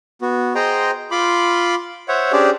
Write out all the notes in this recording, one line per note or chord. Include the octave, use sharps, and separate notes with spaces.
B3 F#4
G#4 C5 D#5 G5 A#5 C6
F4 B5 C6 D6
C5 C#5 E5 F#5
C#4 D4 G4 G#4 C5 D5